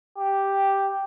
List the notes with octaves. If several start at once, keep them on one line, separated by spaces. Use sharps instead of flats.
G4